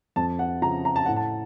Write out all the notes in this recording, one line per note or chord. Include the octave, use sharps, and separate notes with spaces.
F2 A5
F#5
C#3 F3 A#5
A#5
A5
A2 F#5
A5